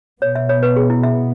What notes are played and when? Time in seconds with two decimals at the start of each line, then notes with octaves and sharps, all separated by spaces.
0.22 B2 B3 C#5
0.35 E5
0.49 C#5
0.63 B4
0.76 G#4
0.90 E4
1.03 E5